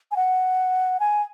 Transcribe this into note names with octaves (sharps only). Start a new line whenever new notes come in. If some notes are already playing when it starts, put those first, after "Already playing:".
G#5
F#5
G#5